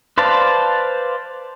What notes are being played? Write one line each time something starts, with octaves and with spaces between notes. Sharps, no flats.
B4 C5 D5 F5 A5